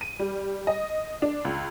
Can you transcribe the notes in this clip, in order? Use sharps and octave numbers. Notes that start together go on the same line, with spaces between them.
D#7
G3
D#5
D4
C#2